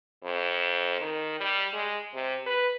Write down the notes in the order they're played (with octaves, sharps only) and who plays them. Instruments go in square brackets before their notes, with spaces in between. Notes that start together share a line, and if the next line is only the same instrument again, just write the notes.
[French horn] F2
D#3
G3
G#3
C3
B4